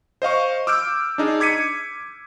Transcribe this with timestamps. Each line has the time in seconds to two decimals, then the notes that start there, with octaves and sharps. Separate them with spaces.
0.22 C5 D#5 F5 C#6
0.67 D6 E6 F6 G6 D7
1.18 D4 D#4 G#4
1.40 D6 G#6 B6 C#7 D#7